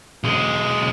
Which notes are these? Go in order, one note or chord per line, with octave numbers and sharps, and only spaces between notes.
B1 G#3